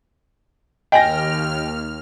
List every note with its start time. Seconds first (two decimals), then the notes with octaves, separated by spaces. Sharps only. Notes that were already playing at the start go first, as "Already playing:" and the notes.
0.92 D#2 D#5 G5 G#5 F6 A#6